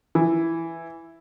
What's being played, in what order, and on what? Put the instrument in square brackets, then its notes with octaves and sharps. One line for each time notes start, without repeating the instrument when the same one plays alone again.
[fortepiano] E3